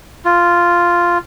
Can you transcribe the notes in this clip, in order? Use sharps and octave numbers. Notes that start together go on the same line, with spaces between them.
F4